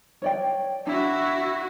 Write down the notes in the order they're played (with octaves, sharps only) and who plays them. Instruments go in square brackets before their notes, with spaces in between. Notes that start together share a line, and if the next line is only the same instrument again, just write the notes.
[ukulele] C#5 D5 G5
[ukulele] D4 [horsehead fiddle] E4 F#4